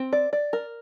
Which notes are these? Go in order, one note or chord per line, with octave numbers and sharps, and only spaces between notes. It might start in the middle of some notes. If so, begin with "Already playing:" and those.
Already playing: C4
D5
D5
A#4